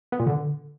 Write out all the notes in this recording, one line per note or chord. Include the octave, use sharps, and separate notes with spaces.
B3
A#2
D3